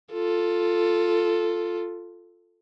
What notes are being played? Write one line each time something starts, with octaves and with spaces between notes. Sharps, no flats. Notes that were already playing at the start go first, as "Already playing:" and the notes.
F4 A4